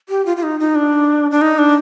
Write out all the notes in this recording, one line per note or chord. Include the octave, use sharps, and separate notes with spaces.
G4
F4
F4
D#4
D#4
D4
D4
D#4
D4